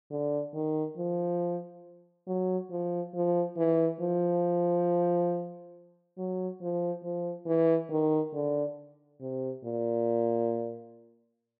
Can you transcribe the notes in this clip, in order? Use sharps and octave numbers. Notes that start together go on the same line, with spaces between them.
D3
D#3
F3
F#3
F3
F3
E3
F3
F#3
F3
F3
E3
D#3
D3
C3
A#2